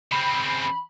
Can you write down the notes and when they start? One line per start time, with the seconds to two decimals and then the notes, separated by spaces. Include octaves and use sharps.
0.12 C#3 C4 B5